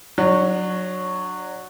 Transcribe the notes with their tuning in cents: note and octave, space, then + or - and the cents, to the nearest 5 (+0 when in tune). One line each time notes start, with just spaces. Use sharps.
F#3 -10 D4 +25